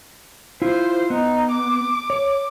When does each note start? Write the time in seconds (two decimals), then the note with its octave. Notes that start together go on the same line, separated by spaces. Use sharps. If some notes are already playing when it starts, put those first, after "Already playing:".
0.62 E4 F4 C5
1.10 B3 D#4
1.52 D6
2.10 C#5